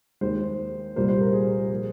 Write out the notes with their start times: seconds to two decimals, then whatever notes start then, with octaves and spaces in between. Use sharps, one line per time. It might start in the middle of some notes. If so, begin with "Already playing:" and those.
0.21 D#2 D#3 G#3 C5
0.96 C2 A#2 G3 A#3 C5
1.08 C5
1.21 A#4
1.33 G#4
1.71 A#2 F3 A#3